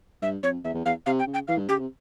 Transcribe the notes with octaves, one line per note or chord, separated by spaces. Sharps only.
G2 E5
F2 C#5
E2 E5
E2
E2 F5
C3 F5
G5
C#3
G5
E3 F5
G2
C#3 G4
C3